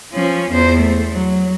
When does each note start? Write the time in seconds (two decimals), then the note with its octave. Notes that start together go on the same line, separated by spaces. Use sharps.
0.14 F3 C#4
0.51 E2 C5
0.80 A3
1.12 F#3